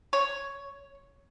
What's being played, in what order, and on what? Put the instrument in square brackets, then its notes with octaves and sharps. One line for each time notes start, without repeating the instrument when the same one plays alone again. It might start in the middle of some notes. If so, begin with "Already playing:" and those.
[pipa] C#5